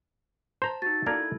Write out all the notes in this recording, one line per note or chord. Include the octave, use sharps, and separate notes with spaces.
C5 A5 A#5
D#4 F#4 A6
A#3 D4 E4 A4 A#4 G#6